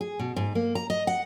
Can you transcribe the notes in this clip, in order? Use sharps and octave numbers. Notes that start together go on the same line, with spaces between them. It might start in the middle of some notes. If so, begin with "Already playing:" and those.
G#4
B2
G#2
A#3
A#5
D#5
F#5